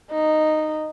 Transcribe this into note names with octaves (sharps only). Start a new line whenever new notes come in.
D#4